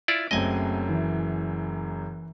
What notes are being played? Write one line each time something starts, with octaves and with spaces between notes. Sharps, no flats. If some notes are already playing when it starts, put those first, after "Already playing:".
E4 F4 D5
F#1 F#2 A3 C4 D#5 G#5
E3